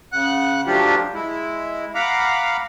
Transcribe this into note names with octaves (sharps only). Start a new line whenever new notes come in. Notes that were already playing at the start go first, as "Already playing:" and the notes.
C#3 F#5 F#6
F3 F#3 A3 D4 F4 G4
G#3 E4
F5 F#5 A#5 B5 D6